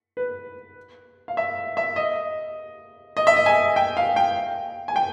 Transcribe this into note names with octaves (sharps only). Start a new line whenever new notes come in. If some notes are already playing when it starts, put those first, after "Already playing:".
B4
F5
E5
E5
D#5
D#5
E5
D#5
G#5
G5
F5
G5
G#5
G5